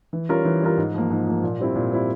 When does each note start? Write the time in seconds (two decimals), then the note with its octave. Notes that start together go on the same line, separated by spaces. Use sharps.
0.13 E3
0.29 G3 C#4 F4 A#4
0.45 E3
0.62 G3 C#4 F4 A#4
0.77 G#2
0.94 F3 A#3
1.10 G#2
1.27 F3 A#3
1.43 A#2
1.60 G3 C4 E4
1.75 A#2
1.92 G3 C4 E4